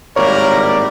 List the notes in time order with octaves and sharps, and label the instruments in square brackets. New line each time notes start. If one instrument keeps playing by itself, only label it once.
[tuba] G#1 [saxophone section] A2 G3 D5 [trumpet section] A#3 A#4 [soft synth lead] C#5